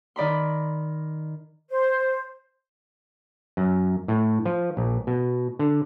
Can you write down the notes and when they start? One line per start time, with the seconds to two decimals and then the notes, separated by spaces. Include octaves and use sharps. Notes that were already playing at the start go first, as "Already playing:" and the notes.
0.16 D#3 D5 B5 C6
1.70 C5
3.57 F#2
4.08 A2
4.46 F3
4.77 A#1
5.07 B2
5.59 D3